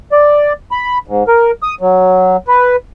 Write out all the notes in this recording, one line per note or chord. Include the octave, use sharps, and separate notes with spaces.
D5
B5
G#2
A#4
D#6
F#3
B4